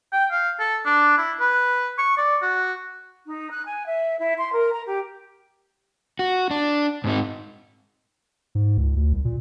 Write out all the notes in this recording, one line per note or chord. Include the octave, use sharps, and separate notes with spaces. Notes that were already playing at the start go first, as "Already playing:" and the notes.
G5
F5
A4
D4
E4
B4
C#6
D5
F#4
D#4
F#6
G#5
E5
E4
C6
A#4
A#5
G4
F#4
D4
G#2 C4 D#4
G#2
C#2
D2
C2
A#2